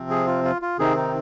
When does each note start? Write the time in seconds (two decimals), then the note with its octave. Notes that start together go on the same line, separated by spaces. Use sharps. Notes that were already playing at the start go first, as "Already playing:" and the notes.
Already playing: C3 F3 C4
0.10 G#4
0.27 F4
0.44 F4
0.62 F4
0.79 C3 D#3 C4 D#4 G#4
0.97 D#4